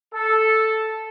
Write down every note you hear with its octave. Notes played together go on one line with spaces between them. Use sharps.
A4